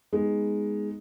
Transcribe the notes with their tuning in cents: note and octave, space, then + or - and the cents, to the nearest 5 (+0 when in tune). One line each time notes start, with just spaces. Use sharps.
G#3 +0 B3 +0 D#4 +0